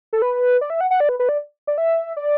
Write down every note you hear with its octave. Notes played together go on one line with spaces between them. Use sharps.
A4
B4
D5
E5
F#5
F#5
D5
B4
B4
D5
D5
E5
D5